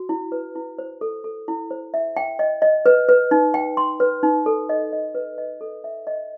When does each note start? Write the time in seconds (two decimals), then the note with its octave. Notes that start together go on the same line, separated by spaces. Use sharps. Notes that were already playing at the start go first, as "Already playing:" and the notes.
Already playing: F#4
0.09 E4
0.32 B4
0.55 E4
0.79 C5
1.01 A4
1.24 A4
1.48 E4
1.71 C5
1.94 E5
2.17 G5
2.39 D#5
2.62 D#5
2.86 B4
3.09 B4
3.31 D#4
3.54 G5
3.77 C6
4.00 B4
4.23 D#4
4.46 A4
4.69 D#5
4.93 D#5
5.15 B4
5.38 D#5
5.61 A4
5.84 E5
6.07 D#5